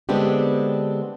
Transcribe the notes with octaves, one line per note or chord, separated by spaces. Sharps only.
D3 G#3 B3 C4 D4 G4